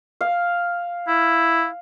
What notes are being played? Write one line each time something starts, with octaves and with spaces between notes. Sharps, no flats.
F5
E4